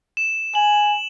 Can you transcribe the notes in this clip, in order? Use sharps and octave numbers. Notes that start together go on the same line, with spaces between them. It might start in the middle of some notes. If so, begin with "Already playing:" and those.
E7
G#5 F#7